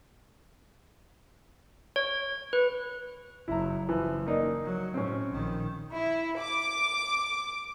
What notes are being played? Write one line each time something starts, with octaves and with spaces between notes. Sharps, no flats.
C#5
B4
F#1 F#3 E4 A#5
F#1 E3 F3
A#3 D#4 D5
F#3
A2 C4 C#4
A#1 D#3
E4
D6